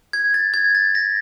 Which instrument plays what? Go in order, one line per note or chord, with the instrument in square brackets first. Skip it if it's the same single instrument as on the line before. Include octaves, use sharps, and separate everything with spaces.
[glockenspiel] G#6
A6
G#6
A6
A#6